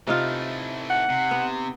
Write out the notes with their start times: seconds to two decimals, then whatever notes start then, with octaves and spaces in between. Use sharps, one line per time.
0.07 C3 E3 A3 D#4 F4
0.90 F#5
1.10 C3
1.31 B3